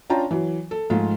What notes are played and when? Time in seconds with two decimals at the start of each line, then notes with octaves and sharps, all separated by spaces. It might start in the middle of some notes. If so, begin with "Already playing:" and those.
0.10 C#4 D4 F4 G5 A5 A#5
0.31 E3 F#3
0.71 A4
0.90 G#2 F3 A3 F4